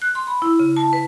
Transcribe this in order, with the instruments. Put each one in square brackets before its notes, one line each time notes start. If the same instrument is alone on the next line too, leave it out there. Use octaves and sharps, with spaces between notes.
[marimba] F#6
C6
B5
E4
C#3
A5
B4